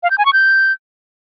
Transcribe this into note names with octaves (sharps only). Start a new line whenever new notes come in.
F5
G6
G#5
C#6
G6